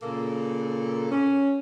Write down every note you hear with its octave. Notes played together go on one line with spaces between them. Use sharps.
A#2 C#3 A#3 A4
C#4